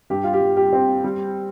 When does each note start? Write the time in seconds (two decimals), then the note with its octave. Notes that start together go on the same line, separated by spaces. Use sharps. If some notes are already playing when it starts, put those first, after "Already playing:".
0.10 G2 G4
0.24 F4
0.33 G4
0.40 G3
0.56 G4
0.73 C4
1.04 G3